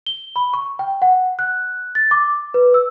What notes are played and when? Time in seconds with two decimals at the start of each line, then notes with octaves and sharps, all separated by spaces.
0.06 G7
0.36 B5
0.54 C#6
0.79 G5
1.02 F#5
1.39 F#6
1.95 A6
2.11 D6
2.54 B4
2.74 E6